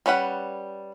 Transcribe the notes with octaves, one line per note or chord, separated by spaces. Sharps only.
G3 C#4 B4 F#5